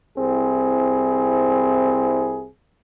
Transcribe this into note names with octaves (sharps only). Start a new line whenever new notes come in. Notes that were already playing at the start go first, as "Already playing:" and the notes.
C2 C4 E4 G#4